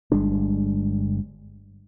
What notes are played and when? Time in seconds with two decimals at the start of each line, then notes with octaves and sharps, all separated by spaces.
0.12 G1 G3 G#3 D4